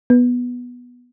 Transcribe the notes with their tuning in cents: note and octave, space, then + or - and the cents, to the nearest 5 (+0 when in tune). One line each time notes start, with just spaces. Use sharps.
B3 -10